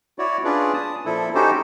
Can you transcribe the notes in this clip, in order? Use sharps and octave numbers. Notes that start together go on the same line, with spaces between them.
E4 F#4 C#5 D5
C#4 D4 F4 G#4 B4 D5
A5 D#6
A#2 F3 E4 A4
C#4 D#4 F#4 G4 A4 C5